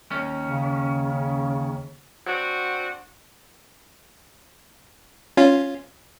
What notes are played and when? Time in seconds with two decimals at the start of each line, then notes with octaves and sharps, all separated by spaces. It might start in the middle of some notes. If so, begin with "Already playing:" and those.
0.11 D#2 C#4
0.46 C#3
2.27 C4 D4 F#4
5.37 C#4 F4